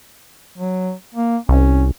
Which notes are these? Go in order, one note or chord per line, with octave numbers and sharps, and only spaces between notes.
F#3
A#3
C2 C#4